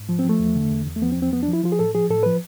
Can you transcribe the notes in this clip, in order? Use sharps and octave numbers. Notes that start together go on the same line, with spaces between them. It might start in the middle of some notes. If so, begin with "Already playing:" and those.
Already playing: G#2
F3
C4
F3
A3
E2
D3
E2
E2
A3
F3 B3
C4
E2
C4
F3 B3
D4
F3
E4
F3 F4
G#4
A2 A4
F3 G#4
A2 A4
F3 B4